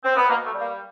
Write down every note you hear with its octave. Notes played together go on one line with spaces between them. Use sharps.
C4
B3
B2 A#3
A3
G3
A#3